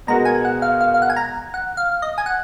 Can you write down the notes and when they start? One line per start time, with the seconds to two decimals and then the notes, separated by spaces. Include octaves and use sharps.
0.07 B2 G#3 B3 F#4 A#4 A#5
0.25 G#5
0.45 F#5
0.62 F5
0.81 F5
0.94 F5
1.02 F#5
1.10 G#5
1.16 A#5
1.54 F#5
1.77 F5
2.02 D#5
2.18 G#5
2.26 F#5